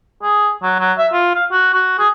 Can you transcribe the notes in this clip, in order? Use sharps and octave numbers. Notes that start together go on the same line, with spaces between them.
G#4
F#3
F#3
E5
F4
F5
F#4
F#4
G#4